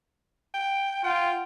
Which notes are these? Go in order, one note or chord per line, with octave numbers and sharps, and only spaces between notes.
G5
F4 F#5 G5